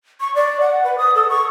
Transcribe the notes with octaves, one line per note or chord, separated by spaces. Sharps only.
C#6
D5
F#5
B4
D#6
A4
C#6